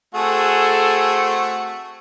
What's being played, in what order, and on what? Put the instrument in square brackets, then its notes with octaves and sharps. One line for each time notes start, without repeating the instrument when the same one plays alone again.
[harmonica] A3 C4 F#4 [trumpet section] G#4 A4